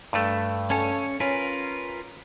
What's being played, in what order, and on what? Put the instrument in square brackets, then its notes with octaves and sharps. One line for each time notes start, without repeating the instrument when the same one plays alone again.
[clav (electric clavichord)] G2 A3
[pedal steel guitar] C#4 C#5 [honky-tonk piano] A4 G#5
[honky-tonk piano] C#4 [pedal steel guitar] F4 A#4 B4 [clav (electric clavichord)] G#5